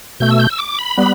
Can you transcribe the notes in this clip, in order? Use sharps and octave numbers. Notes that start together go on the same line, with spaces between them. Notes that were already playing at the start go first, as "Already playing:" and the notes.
B2 A3 G6
E6
G6
E6
D6
B5
G3 B3